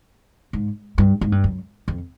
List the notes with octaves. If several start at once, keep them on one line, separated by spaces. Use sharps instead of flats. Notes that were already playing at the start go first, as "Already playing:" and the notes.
G#2
G2
G#2
G2
F#2
F2